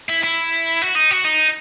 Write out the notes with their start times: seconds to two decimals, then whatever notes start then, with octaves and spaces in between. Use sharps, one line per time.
0.09 E4
0.24 E4
0.82 F#4
0.95 D#4
1.11 F#4
1.24 D#4